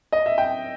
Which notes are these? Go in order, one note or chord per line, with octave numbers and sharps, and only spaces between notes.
D#5
E5
G5